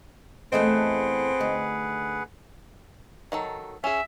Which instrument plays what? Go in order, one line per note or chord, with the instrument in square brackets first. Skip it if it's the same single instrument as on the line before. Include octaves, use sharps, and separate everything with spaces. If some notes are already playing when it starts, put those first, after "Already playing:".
[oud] E2 A3 D#5 [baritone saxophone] C4 [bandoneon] G#4 B4 F#5
[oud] D2 D#4
[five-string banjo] D#3 F#3 A4
[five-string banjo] C#4 G#4 [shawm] E5